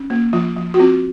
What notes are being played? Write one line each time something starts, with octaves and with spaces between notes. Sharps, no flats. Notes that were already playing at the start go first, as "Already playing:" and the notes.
Already playing: C#4
A#3
F3 F4
F3
F#4
C4 F4